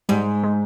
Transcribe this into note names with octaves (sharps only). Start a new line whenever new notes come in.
G#2 G3
G#3